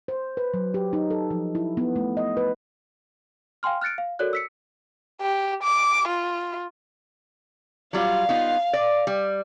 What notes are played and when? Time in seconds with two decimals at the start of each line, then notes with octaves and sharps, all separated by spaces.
0.08 C5
0.37 B4
0.54 F#3
0.74 G4
0.93 D#4
1.10 A4
1.31 F3
1.55 E4
1.77 B3
1.96 A3
2.17 D#5
2.37 B4
3.63 F5 G5 G#5 C6 F6
3.81 F6 F#6 A6 C#7 D7
3.98 F5
4.19 F#4 A4 A#4 C#5 D5 F#6
4.33 E6 B6 C#7
5.22 G4
5.63 D6
6.08 F4
7.93 F#3 G3 F4 F5
8.29 B3 D#4 F4
8.73 D5
9.07 G3